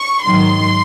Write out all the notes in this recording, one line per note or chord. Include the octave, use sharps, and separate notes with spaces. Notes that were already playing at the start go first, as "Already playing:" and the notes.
Already playing: C#6
G#2 D#3 F#3 C6